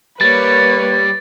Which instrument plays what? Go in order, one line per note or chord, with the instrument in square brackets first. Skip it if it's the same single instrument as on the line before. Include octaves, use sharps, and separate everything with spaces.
[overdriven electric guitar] G3 [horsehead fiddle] A#3 C#5 [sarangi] B4 [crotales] A6